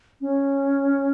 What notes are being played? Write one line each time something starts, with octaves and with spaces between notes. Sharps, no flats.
C#4